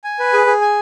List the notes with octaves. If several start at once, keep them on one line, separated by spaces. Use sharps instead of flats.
G#5
B4
G#4
G#4
G#5